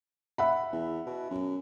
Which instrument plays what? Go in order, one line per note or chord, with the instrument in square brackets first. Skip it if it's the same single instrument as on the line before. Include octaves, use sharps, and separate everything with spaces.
[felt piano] E5 F#5 B5
[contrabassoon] E2
B2
F#2